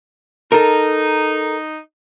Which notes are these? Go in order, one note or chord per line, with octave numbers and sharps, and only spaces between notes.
D#4 A4 A#4